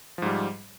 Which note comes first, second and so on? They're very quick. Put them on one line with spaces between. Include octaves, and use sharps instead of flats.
F3 G#2 G3